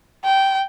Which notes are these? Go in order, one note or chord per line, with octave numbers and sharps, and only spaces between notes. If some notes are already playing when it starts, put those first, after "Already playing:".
G5